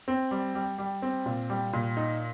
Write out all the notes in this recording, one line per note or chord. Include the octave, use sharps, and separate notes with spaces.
C4
G3
G3
G3
C4
A#2
G3
A#2
D#4